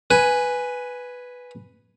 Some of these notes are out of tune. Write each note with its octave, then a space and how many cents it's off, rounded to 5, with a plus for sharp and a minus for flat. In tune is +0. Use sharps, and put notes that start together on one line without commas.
B4 +0 G#5 +0